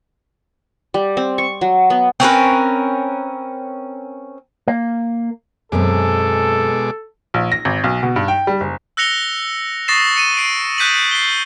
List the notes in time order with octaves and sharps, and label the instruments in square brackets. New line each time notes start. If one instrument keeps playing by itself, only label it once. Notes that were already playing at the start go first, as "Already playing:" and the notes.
[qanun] G3
C4
C#6
F#3
B3
[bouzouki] C4 C#4 A#4 B4
[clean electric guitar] A#3
[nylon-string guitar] F#2 B3 C4 [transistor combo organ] B2 G#3 D6 [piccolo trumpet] A4
[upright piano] A#1
A#6
G#1
B1
B2
G2
G5
G3
F#1
[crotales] E6 F#6 A#6 C#7 F7 G7
C#6 D#6 A6 A#6 C7 E7
C#7 D#7 E7
C7 D7
D#6 F#6 G6 B6 D#7 F#7
C7 G7